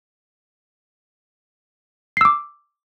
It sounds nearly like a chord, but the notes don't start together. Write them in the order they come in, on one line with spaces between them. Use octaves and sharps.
C7 E6 D6